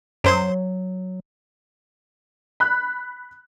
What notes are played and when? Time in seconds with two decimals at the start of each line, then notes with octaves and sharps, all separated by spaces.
0.24 F#2 F#3 C5 C6
2.60 B5 F#6